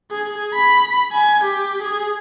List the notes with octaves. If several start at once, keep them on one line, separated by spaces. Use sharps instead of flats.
G#4
B5
G#5
G4
G#4